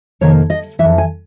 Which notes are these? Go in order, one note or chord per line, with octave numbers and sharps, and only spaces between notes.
F2 C3 D#3 A#3 C#5
D#5
F2 C#3 E3 E5
G#5